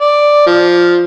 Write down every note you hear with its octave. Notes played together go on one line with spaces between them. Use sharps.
D5
F3